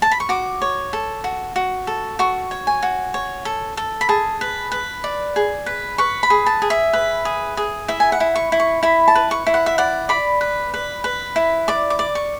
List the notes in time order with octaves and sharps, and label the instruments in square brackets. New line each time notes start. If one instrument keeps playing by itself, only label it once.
[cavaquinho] A5
B5
C#6
F#4 D6
C#5
A4
F#4
F#4
A4
F#4 C#6
C#5
G#5
F#4
C#5
A4
A4
B5
G#4 A5
B4
B4
D5
G#4
B4
B4 C#6
B5
G#4
A5
G#4
E5
B4
G#4
G#4
E4 E5
G#5
F#5
E4
C#6
E4
C#6
E4 B5
A5
B4
C#6
E4
F#5
E5
D5 F#5
D5 B5
B4
B4
B4
E4
D5 D6
D6
D5
C#6